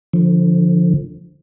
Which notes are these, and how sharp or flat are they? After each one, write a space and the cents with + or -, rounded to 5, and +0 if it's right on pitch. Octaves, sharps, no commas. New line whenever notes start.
D3 +0 F3 +0